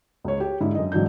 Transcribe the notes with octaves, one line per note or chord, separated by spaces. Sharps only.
C#2 C#5
G4
G#2 D3 E4 E5
F#2 D#5
G#2 E3 F#3 D4 G6